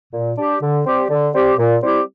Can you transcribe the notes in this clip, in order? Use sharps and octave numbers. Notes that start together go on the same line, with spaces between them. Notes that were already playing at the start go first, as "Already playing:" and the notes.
A#2
G3 D4 G4
D3
G3 C4 G4
D3
G3 C4 G4
A#2
G3 C4 E4 G4